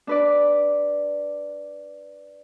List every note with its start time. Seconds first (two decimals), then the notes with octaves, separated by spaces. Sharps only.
0.07 D4 B4 D5